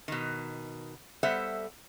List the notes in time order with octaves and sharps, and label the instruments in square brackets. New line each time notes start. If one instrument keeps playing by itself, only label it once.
[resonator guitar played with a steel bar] B2 D#3
G3 B3 A4 C5 E5 F#5